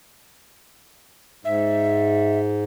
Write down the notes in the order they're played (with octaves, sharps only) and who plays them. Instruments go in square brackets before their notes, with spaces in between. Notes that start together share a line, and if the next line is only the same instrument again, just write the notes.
[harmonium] G#2 [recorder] E5